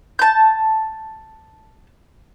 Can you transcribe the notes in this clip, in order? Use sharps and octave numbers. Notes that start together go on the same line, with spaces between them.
A5 G6